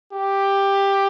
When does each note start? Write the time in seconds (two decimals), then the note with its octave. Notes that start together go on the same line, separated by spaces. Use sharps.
0.12 G4